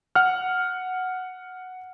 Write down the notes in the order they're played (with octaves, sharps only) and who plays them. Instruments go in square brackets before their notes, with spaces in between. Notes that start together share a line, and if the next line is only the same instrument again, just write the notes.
[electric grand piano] F#5 F6